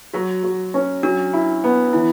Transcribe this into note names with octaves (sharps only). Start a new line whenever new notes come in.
F#3 F#4
F#3
C#4
F#3 D4
E4
B3
E3 E4